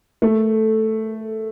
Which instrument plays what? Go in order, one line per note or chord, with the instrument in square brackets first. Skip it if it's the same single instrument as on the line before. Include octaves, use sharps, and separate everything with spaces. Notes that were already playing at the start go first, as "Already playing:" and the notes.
[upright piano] A3